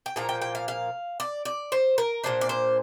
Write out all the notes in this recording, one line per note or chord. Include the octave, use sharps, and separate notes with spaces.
G5
A#2 F3 A#3 A#5
G5
G5
F5
F5
D5
D5
C5
A#4
A#2 A#3 D4 C5
D5
C5